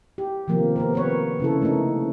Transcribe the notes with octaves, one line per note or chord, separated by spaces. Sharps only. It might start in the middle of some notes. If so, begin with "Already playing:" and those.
G4
C3 D#3 F3 A#3 B3
B3 C4 A#4
A#3 B4 C#5
C#3 E4 A4
A3 A#3 C#4 D#4 E4